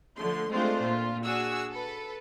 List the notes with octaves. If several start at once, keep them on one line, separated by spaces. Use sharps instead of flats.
D3 F3 A3 C6
G#3 A3 C4 D4 F4 C5
A#2 F4
D4 F#4 G#4 E6
A4 B4